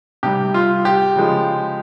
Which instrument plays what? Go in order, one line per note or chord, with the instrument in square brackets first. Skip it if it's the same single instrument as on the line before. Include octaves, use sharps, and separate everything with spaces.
[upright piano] C3 G3 G4
F4
G4
C#3 F3 G#3